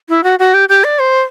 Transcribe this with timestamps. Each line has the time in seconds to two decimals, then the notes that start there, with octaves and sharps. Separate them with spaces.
0.09 E4
0.24 F#4
0.39 F#4
0.54 G4
0.69 G4
0.84 D5
0.99 C5